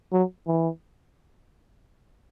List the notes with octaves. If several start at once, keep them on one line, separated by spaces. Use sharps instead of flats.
F#3
E3